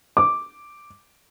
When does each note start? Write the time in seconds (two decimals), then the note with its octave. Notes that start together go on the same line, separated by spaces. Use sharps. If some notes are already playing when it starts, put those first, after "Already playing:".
0.17 D6